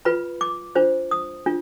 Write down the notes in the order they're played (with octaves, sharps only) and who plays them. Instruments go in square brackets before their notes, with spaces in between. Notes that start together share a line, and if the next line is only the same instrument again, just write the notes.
[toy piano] F4 B4 B5
D6
D4 F4 C5
D#6
D4 F4